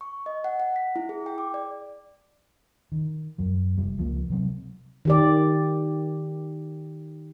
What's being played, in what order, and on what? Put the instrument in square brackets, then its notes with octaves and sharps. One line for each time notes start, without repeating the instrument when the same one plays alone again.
[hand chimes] C#6
D#5
F#5
F#5
B6
E4
G#4
G5
D6
D5
[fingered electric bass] D#3
F#2 F#3
F1 G3
C#2 F3 A3 A#3
C3 F#3 C4
[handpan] D#3 G4 D5